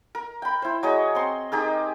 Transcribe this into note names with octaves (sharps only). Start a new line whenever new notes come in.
A#4
G5 B5
E4 C5
F#3 G#4 C#5 D#5
C4 C6
D#4 G4 G#4 A#4